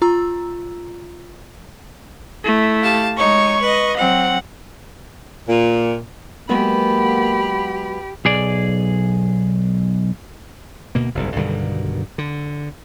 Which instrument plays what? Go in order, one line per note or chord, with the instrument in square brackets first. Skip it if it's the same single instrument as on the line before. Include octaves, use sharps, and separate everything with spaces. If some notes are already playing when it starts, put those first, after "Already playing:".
[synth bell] F4 A#5 E6
[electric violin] A3 E4
[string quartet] G4 F5 A5
[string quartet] G#3 D#4 C#5 [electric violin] C#6
[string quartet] B4 D#5
[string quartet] F#3 C4 [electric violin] F#5
[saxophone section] A#2
[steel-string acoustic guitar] F#3 G#3 B3 [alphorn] A#3 [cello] G4 [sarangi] B5
[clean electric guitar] B1 G#4 D5
[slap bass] D2 B2 A#3
F#1 C2 G#2
B1 G2 D3 D#3
D3